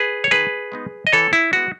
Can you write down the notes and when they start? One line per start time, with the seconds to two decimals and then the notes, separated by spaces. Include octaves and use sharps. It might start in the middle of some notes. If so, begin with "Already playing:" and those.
Already playing: G#4 B4
0.24 C#5
0.31 D#3 G#4 B4
0.72 G#3 B3 D#4
1.07 D#5
1.12 E3 A4 C#5
1.33 E4
1.53 G#3 B3 E4 F#4